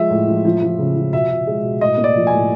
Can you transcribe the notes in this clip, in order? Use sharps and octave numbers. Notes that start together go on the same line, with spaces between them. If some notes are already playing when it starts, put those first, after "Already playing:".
Already playing: F3 G#3 E5
A2
F3
F3
F3
C#3
F3
B2 E5
B2
G#3
B2
A2 D#5
A#3
D5
F3
G#5
A2